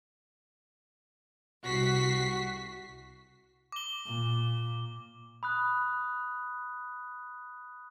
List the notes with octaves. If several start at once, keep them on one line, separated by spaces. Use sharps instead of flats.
C2 F#4 B6 C7
D6 G7
A#2
B5 D#6 F#6